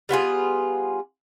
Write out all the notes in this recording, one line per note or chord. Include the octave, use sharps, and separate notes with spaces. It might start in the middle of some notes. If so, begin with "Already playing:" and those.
G3 B3 F4 G#4